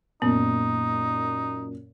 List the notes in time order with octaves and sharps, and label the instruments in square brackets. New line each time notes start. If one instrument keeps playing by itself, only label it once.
[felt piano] F#2 A#2 [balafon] B3 [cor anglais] D#4